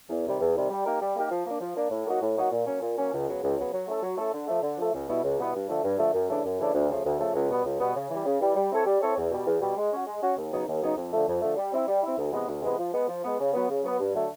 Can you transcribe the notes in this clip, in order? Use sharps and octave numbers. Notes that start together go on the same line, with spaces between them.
E2
C3 D#3 G3
E2
C3 D#3 G3
G3
A#3 D#4 G4 A#4
G3
A#3 D#4 G4 A#4
F3
A#3
D4
F3
A#3 D4
A2
F#3 A#3 D#4 F#4
A2
F#3 A#3 D#4 F#4
A#2
F#3 A#3 C#4
A#2
F#3 A#3 C#4
C#2
C#3 F#3 B3
C#2
C#3 F#3 B3
F#3
A3 C#4 E4 A4
F#3
A3 C#4 E4 A4
D3
F3 A3
D3
F3 A3
C#2
B2 G3 B3 E4
C#2
B2 G3 B3 E4
G2
D3 F3 A3
G2
D3 F3 A3
F#2
C#3 E3 A3 D4
F#2
C#3 E3 A3 D4
D2
C#3 F3 A3
D2
C#3 F3 A3
C#2
B2 G3 B3
C#2
B2 G3 B3
C#3
E3 G3
C#3
E3 G3
G3
C4 E4 A4 C#5
G3
C4 E4 A4 C#5
E2
B2 G3
E2
B2 G3
G#3
C#4 F#4
G#3
C#4 F#4
D#2
C#3 F#3 B3 D#4
D#2
C#3 F#3 B3 D#4
F2
D3 F3 A3
F2
D3 F3 A3
G3
C4 E4
G3
C4 E4
D2
C3 E3 G#3 B3
D2
C3 E3 G#3 B3
F3
G#3 B3
F3
G#3 B3
C#3
F#3 B3
C#3
F#3 B3
G2
D3 F#3 A3